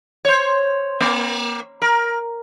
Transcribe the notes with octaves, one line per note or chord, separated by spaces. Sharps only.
C5 C#5
A#3
A#4